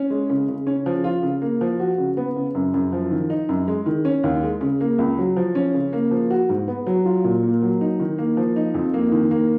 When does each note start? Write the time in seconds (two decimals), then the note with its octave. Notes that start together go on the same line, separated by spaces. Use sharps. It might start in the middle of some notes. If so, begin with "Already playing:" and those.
Already playing: C#4
0.10 G#3
0.29 C#3
0.48 C#3
0.67 C#4
0.86 F3
1.04 F4
1.23 C#3
1.42 A#3
1.61 F3
1.80 F#4
1.98 C#3
2.17 B3
2.36 C#3
2.55 F#2
2.74 F#2
2.93 F3
3.11 D#3
3.30 D#4
3.49 F#2
3.68 G#3
3.86 D#3
4.05 C#4
4.24 D#2
4.43 G#3
4.61 C#3
4.80 A#3
4.98 C#2
5.18 F#3
5.36 F3
5.55 C#4
5.74 C#3
5.93 A#3
6.11 F3
6.30 F#4
6.49 G#2
6.68 B3
6.87 F#3
7.05 F4
7.24 A#2
7.43 A#3
7.62 F#3
7.81 D#4
8.00 D#3
8.18 A#3
8.37 F3
8.56 D#4
8.74 F2
8.94 A#3
9.12 D#3
9.31 A#3